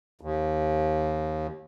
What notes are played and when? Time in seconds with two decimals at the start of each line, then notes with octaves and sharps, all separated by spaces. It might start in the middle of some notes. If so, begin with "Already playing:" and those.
0.21 D#2